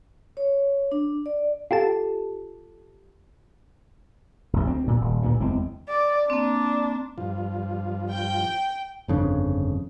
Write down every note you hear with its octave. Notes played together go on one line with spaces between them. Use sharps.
C#5
D4
D5
F4 G4 A4 A5
F1 A#1
D2 C4
D2 A#2
D#1
D2 G2 A#2
F#1 E2 G#3 C4
D5
A#3 C4 D4
G2 F3 F4
G5
G1 F2 C#3 D4